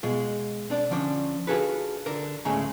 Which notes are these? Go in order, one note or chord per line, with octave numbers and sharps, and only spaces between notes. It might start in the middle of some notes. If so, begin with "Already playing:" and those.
B2 G#3 F4
C4 D4 D5
D3 F3 C#4 D4
D4 F4 F#4 G#4 A4 B4
D3 A#4
D2 A2 C#3 G#3 A3 A#5